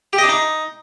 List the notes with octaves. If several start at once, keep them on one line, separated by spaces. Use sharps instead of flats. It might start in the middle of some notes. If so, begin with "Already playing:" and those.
G4
D#5
D4
D#4